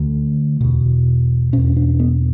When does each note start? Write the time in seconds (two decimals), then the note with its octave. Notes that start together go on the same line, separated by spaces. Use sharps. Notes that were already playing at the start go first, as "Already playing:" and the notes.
Already playing: D2 D3
0.61 E2 B2
1.53 E2 B2 C#4
1.76 D4
1.99 B3